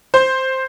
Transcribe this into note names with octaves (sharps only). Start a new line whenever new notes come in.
C5